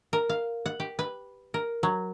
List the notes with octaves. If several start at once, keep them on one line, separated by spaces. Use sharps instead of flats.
A#4
F5
F#5
G4
B4
A#4
F#3